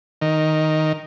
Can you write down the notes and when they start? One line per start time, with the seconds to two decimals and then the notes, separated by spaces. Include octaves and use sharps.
0.22 D#3